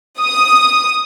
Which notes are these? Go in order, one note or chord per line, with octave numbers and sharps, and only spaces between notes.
D#6